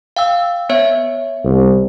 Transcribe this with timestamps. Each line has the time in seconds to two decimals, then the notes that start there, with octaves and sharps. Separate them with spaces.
0.16 F5 G5 E6
0.69 B3 C#5 E5
1.44 C2